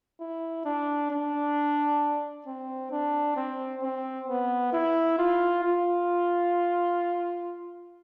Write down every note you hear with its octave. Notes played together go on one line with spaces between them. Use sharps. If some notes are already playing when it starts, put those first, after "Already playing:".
E4
D4
D4
C4
D4
C4
C4
B3
E4
F4
F4